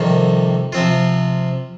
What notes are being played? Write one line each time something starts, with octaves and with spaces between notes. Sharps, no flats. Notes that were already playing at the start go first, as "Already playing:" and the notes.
Already playing: F2 C3 D#3 G3 A#3
C3 F3 C4 F4